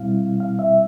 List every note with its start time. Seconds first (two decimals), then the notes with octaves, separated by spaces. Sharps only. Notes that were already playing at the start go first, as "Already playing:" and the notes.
Already playing: B2 G3 C4 E4 F5
0.40 F5
0.59 E5